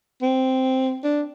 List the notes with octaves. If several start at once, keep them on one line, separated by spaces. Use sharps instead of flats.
C4
D4